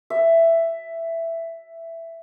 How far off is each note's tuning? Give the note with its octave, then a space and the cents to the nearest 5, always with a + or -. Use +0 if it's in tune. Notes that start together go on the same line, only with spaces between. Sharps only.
E5 +10